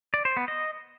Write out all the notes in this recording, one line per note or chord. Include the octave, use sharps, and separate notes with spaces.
D5
C5
B3
D#5